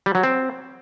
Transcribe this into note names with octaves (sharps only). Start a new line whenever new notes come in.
G3
F#3
C4